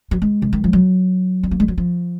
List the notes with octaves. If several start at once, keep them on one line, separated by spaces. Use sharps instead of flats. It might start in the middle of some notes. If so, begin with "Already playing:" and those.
F#3
G#3
C#3
D#3
F3
F#3
C4
A#3
G#3
F#3
F3